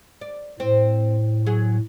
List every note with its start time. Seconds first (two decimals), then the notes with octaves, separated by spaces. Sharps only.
0.21 D5
0.60 A2 C4
1.46 F#3 G#4